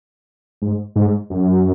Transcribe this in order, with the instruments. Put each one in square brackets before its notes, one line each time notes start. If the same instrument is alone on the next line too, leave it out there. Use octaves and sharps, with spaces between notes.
[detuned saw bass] G#2
G#2
F#2